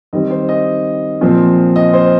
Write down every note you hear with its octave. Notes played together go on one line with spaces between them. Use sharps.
D#3 G3 C4 D#5
C5
D#5
A#2 F3 C4
D#5
C5